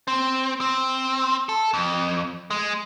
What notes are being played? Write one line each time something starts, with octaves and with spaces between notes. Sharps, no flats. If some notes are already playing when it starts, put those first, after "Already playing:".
C4
C4
A4
F2
G#3